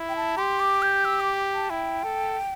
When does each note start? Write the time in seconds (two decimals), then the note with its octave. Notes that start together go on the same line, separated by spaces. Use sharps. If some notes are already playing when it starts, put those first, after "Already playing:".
Already playing: E4
0.09 G5
0.16 A5
0.37 G4 C6
0.60 D6
0.82 G6
1.05 E6
1.20 D6
1.54 A5
1.70 E4 G5
2.04 A4